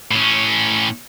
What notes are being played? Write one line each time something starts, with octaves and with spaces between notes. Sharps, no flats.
A2 C#4